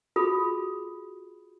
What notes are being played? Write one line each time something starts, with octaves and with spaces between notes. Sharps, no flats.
F4 F#4 G#4 A4 B5 D#6